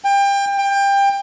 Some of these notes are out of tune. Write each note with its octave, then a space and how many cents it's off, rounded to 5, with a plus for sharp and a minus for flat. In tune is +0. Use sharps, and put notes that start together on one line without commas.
G5 +30
G5 +25